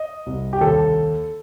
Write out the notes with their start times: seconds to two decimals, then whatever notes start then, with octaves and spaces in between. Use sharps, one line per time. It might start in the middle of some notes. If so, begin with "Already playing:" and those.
Already playing: D#5
0.26 C2
0.53 G4
0.61 D#2 A4